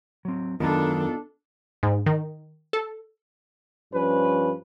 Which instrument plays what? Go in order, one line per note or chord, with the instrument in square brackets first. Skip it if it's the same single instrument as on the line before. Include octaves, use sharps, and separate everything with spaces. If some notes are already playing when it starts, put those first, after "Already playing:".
[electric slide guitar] F#3 C4
[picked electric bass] F#2 D#3 [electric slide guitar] B3 D#4 F4 [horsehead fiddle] D4 A4
[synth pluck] G#2
D#3
A4
[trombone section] G2 F3 C#4 B4